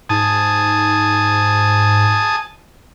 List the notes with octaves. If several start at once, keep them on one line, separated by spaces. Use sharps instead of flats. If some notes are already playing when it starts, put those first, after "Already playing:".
G#2 G#5 A5 D#6